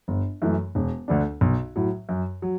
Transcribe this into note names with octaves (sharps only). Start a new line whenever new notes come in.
G1
F#2 E3 A3
E1
D2 D3 A3 D4
B1
A2 F#3
F#2
F#3